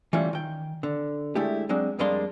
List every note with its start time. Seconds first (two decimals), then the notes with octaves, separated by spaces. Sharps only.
0.13 E3 G3 A3 C#4 F4 C#5
0.33 D#3 G5
0.83 D3
1.35 G#3 A3 D4 E4 G4
1.69 F#3 G#3 C4 D4
1.99 F2 G3 G#3 A#3 D4 C6